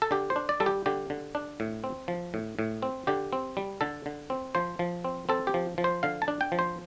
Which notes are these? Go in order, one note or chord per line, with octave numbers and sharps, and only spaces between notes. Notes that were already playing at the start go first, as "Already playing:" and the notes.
A4
D3 G4
C5
D4
D5
G3 A4
G4
D3 G4
D3
D4
A2
C4
F3
A2
A2
C4
D3 G4
C4
G3
D3 A4
D3
C4
F3 C5
F3
C4
C4 A4
G4
F3
F3
C5
D3 F5
A5
D4
G5
F3
C5